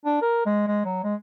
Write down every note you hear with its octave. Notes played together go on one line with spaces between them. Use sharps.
D4
A#4
G#3
G#3
F#3
G#3